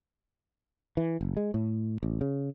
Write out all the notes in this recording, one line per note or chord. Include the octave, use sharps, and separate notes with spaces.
E3
F#1
G#3
A2
A1
C#3